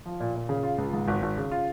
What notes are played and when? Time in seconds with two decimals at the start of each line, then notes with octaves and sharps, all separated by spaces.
0.06 F3
0.20 A#2
0.35 A#2
0.49 C#3
0.63 F4
0.78 C#2
0.93 G#2
1.08 G#1
1.22 G#1
1.37 C#3
1.51 F4